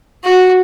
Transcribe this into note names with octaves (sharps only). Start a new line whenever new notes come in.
F#4